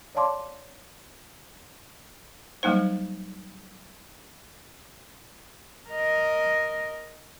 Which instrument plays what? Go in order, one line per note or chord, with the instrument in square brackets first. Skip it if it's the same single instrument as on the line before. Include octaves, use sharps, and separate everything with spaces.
[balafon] C#5 D5 F5 A5 C6 D6
F#3 G3 A#3 D#4 C5
[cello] A#4 D#5